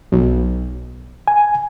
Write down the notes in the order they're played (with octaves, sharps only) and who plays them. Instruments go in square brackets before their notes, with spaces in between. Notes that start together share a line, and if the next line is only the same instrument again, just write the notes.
[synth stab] B1
[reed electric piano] G#5